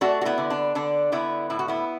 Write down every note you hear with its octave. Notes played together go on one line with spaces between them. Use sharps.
A3 D4 F#4
F#4
B3 E4
D3
D4
D3 D4
D3 B3 E4
A2 E4
F#4
B3 E4